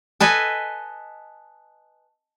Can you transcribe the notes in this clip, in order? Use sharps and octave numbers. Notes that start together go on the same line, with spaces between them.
A4 B4 D#5 G#5